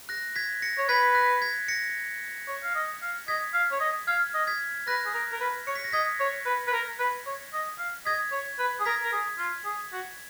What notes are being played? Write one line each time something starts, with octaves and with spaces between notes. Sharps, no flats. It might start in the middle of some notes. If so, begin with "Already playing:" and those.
F#6 A#6
G#6 B6
A#6 C#7
C#5
B4 G#6 B6
F#6 A#6
G#6 B6
A#6 C#7
C#5
F5
D#5
F5
D#5 G#6 B6
F5
C#5
D#5
F5 F6 G#6
D#5
G#6 B6
B4 F#6 A#6
G#4
A#4
A#4
B4
C#5 C#7
B6
A#6
D#5 G#6 B6
C#5
B4
B4
A#4
B4
C#5
D#5
F5
D#5 G#6 B6
C#5
B4
G#4
A#4 G#6 B6
A#4
G#4
F4
G#4
F#4